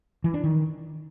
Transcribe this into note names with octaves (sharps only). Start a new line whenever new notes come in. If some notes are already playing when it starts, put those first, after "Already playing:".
E3
D4
D#3